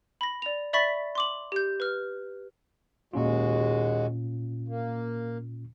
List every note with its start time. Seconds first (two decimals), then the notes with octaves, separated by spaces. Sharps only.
0.21 B5 A#6
0.42 D5 F7
0.73 D5 E5 B5 C#6 A6 B6
1.15 C6 D6 F#7
1.52 G4 G6
1.80 B4 F6
3.13 D#2 A#2 G#3 C#4 F4 F#4
4.68 A#3